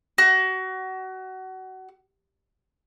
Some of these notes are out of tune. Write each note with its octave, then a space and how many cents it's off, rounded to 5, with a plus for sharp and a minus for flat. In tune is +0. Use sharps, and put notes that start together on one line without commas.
F#4 +25